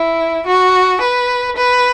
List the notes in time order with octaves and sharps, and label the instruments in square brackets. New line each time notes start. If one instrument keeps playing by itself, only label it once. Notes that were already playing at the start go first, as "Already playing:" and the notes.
Already playing: [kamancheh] E4
F#4
B4
B4